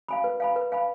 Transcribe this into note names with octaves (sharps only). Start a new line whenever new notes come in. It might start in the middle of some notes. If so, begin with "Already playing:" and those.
F5 G#5 B5
B4
F5 G#5 B5
B4
F5 G#5 B5